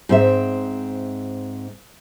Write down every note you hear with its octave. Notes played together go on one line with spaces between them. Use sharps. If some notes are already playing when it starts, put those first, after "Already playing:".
G#2 C4 E5